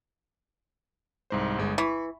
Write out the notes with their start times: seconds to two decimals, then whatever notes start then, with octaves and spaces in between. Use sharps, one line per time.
1.30 C2 G#2 C5
1.58 G1 G#3
1.78 E3 B5 C#6